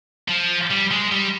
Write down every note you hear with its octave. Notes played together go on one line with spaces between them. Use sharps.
F3
G3
G#3
G3